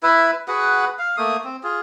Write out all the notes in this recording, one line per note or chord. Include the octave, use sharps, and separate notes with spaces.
E4 B4 E5
F#4 G#4 B4 F#5
F5
A3 A#3 D#6
C4
F4 G#4